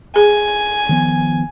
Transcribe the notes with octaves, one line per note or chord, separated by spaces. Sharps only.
G#4 G#5
D#3 F3 B3